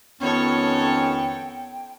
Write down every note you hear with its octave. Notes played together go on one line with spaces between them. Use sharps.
F2 D#3 B3 C#4 A4 C#5 G5